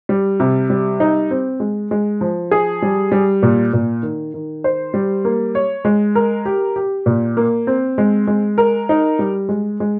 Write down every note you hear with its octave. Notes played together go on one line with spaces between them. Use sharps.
G3
C3
G3
D#4
C4
G#3
G#3
F3
G#4
G3
G3
A#2
A#2
D#3
D#3
C5
G3
A#3
C#5
G#3
A#4
G4
G4
A#2
A#3
C4
G#3
G#3
A#4
D#4
G3
G#3
G#3